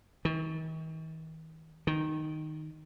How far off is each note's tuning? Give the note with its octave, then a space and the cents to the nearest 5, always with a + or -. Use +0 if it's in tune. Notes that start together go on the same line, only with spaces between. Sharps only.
D#3 +45
D#3 -5